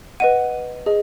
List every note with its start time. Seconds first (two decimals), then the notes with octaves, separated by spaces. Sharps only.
0.20 B4 D#5 F#5 D#7
0.86 G#4 D#5